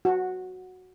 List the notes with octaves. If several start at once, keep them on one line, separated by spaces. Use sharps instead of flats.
F#4